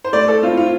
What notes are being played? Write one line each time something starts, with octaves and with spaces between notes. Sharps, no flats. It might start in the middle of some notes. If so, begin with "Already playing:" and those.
C5
A3 D5
A4
C4 E4 F4
F4